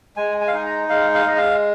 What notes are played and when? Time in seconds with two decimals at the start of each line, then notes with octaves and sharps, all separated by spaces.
0.16 G#3 G#5
0.41 G#5
0.48 F5
0.53 D#4 G#5
0.66 A#5
0.89 G#3 F5
1.14 F5
1.26 G#3 D#5
1.38 F5